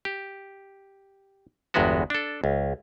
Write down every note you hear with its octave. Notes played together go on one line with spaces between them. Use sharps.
G4
G1 E2 G2 G#3 B3 F#4
D4 A4
C#2